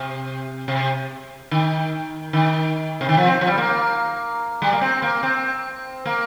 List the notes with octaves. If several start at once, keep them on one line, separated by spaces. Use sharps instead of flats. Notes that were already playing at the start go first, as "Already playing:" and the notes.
Already playing: C3
C3
D#3
D#3
C3
D#3
F3
C4
F3
G3
A#3
G3
A#3
C4
A#3
C4
A#3